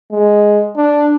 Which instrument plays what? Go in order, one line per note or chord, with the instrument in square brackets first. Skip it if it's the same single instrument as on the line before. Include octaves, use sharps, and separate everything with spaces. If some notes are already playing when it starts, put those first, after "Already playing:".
[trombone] G#3
D4